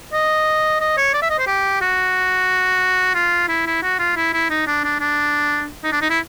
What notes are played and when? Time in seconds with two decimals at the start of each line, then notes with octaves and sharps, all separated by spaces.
0.13 D#5
0.81 D#5
0.97 C#5
1.14 D5
1.22 E5
1.30 D#5
1.39 C5
1.47 G4
1.82 F#4
3.15 F4
3.49 E4
3.67 E4
3.83 F#4
3.99 F4
4.16 E4
4.33 E4
4.50 D#4
4.67 D4
4.84 D4
5.00 D4
5.84 D#4
5.92 D4
6.02 D#4
6.10 E4